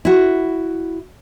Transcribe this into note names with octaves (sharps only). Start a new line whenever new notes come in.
E4 F#4